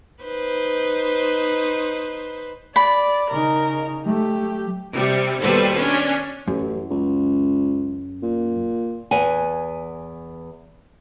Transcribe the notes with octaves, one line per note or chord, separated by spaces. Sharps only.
D#4 B4 C5
D5 B5
C#3 D#4 A#4
F#3 A3 G4
C3 G3
D#2 B2 G3 A4 B4 C5
C#4 D4
A1 F#2
C#2
A#2
E2 F#5 G#5